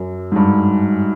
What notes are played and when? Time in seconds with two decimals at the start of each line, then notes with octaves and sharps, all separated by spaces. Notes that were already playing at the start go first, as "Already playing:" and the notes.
Already playing: F#2
0.32 G#2
0.36 G2